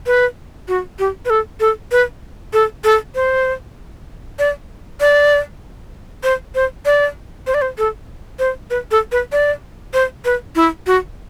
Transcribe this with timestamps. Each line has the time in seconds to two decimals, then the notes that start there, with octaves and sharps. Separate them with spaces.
0.06 B4
0.68 F#4
0.99 G4
1.25 B4
1.30 A4
1.60 A4
1.92 B4
2.53 A4
2.84 A4
3.15 C5
4.39 D5
5.00 D5
6.23 C5
6.55 C5
6.85 D5
7.47 C5
7.54 D5
7.61 C5
7.78 A4
8.39 C5
8.70 B4
8.91 A4
9.12 B4
9.32 D5
9.93 C5
10.25 B4
10.55 E4
10.87 F#4